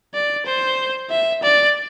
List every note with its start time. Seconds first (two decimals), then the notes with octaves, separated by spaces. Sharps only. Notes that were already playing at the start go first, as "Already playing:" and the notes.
0.14 D5
0.46 C5
1.10 E5
1.43 D5